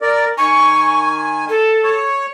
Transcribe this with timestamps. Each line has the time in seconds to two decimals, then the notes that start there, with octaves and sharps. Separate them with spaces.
0.02 A#4 D5
0.38 D#3 G#5 C#6
1.49 A4
1.84 C#5